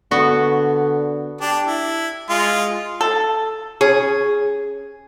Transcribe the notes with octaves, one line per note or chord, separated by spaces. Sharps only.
D3 B3 F#4
D4 G4
E4
G#3 F4
A4
C#4 G#4